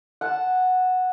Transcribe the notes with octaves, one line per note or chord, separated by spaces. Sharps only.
F#5 A5